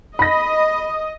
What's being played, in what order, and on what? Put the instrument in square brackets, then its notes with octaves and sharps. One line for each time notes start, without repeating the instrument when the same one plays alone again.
[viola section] D#5 [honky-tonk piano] B5 A#6